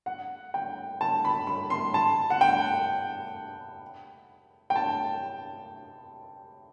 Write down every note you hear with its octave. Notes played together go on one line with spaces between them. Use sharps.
F#5
G5
A5
B5
B5
C6
A5
F#5
G5
G5
A5